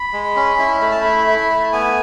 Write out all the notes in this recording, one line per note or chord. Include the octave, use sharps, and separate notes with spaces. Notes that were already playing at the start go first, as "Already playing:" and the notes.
Already playing: B5
G#3
C#4
E4
A3 B5
A5
E4 B5
E4
A3
B3 G#5